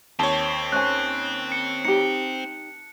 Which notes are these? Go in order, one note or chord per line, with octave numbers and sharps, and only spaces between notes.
D#2 C4 C#5 A5
C#4 C5 G#5 F#6
C#7
D#4 G4 C#7